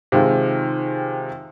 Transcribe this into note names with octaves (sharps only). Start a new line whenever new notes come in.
C3 D#3 F3 G#3